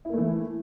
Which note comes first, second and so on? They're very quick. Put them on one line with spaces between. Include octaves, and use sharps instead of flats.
E4 A#3 A3 E3